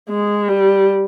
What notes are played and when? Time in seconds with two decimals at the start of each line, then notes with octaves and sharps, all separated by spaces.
0.09 G#3
0.49 G3